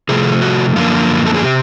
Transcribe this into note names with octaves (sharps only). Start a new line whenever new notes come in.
C3 F3 A3 G#4
F#4
F#2 D3 F3 A#3 F4
A4
G#4
C3 G4